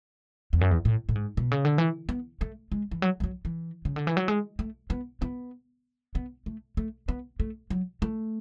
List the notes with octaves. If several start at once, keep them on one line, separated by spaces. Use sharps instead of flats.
E2
F#2
E2
A2
A2
G#2
B2
C#3
D3
E3
B3
A3
G#3
E3
F#3
G#3
F#3
E3
C#3
D3
E3
F#3
G#3
A3
B3
B3
B3
A3
A3
B3
A3
F#3
A3